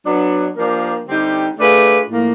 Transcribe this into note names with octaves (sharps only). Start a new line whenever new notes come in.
F#3 B3 D4
F3 A#3 D4 G4 A#4
D3 G3 C4 D#4 G4
A3 D4 F4 G#4 B4
A2 F3 A#3